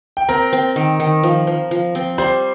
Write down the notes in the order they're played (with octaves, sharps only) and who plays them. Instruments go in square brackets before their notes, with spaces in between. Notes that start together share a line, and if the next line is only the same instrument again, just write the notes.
[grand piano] G5
[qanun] C4 [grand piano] A#4 A#5
[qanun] C4
D#3
D#3
F3
F3
F3
C4
[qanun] G3 [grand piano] C5 C6